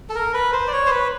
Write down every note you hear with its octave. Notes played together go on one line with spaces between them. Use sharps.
A4
A#4
B4
C5
D5
C#5
C5
B4